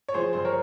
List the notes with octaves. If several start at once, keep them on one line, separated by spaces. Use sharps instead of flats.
C#5
F3 G#4 C5
G2 C5
A#4 C#5